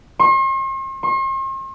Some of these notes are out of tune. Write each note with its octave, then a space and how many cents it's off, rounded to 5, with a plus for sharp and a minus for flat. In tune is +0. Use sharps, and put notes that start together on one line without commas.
C6 +45
C6 +45